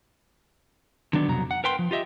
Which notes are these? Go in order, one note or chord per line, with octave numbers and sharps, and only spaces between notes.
D3 D#3 F#3 B3 D4
C2 F2 B2 F#3 A#5
F#5
A#4 B4 G5 C6
F3
F4 G4 D#5 E5